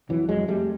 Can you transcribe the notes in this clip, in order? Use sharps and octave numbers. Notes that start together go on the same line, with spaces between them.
F2 E3 F#3
F2 F#3 G#3
F2 G3 A3